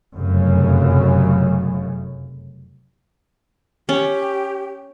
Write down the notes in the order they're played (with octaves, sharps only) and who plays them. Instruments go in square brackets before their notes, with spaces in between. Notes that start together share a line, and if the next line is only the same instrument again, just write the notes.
[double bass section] F1 F#2 C#3
[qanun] C#4 [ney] G4